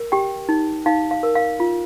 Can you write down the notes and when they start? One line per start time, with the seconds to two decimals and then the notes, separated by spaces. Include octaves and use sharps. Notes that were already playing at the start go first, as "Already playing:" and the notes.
Already playing: A#4
0.12 G4 G5
0.49 D#4
0.86 D#4 F5
1.11 F5
1.23 A#4
1.35 F5
1.60 F4